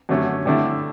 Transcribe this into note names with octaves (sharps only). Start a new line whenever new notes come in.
F#2 D3 A3 C#4
G2 D3 A3 E4